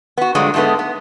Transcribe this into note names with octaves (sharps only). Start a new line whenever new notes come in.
B3 F#4
G2 A#2 D3 F#3 G#3
G#2 D3 G#3 A3 B3
B3